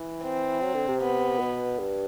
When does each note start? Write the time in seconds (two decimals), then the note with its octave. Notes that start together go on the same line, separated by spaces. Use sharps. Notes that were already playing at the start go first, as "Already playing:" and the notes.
Already playing: E3
0.24 C4
0.62 F#3
0.75 D3
0.88 C3
1.01 B3
1.39 B2
1.79 G2